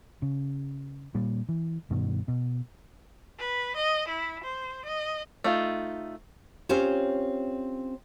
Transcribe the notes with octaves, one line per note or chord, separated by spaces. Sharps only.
C#3
A#2 G3
E3
G2 B2 D#3
B2
B4
D#5
E4
C5
D#5
A3 D#4 F4
C4 C#4 F4 G4 C5 C#5